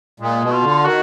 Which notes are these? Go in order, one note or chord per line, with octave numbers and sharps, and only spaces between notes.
A#2 G#3
B2
F4
D3
D#3 F#4